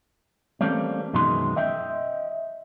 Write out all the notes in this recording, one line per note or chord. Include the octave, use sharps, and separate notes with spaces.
E3 G3 A3 A#3 C4 C#4
F#2 B2 D#3 E3 G#3 C6
D#5 E5 G5